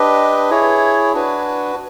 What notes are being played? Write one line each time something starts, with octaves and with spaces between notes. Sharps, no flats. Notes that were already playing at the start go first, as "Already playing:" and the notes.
Already playing: D4 G4 B4 D#5
E4 G#4 C#5
D4 F#4 B4